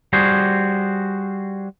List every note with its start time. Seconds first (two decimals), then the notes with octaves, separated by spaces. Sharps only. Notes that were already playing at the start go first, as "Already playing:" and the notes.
0.13 G3 F#4 G#4 C5